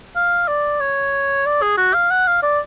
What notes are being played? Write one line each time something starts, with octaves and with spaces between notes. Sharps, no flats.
F5
D5
C#5
D5
G#4
F#4
F5
F#5
F5
D5